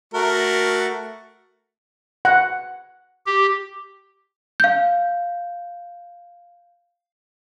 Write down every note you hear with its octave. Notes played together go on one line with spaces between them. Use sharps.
A3 F#4 A#4
F#5
G4
F5 G6